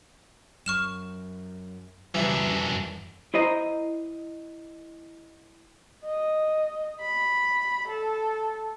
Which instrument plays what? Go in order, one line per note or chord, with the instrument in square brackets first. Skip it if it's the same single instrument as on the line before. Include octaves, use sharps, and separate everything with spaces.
[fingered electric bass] F#2 [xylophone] C#6 F6 E7
[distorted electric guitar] F#2 D4 [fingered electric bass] C#3 G3 [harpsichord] E3
[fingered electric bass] F2 G3
[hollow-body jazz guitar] E4 C5 D#5 A#5
[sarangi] D#5
B5
A4